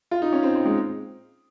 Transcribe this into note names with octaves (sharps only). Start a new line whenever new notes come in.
F4
D#4
C#4
C4
C4
G#3